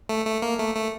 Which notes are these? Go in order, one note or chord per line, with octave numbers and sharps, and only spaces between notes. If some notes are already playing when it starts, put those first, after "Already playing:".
A3
A3
A#3
A3
A3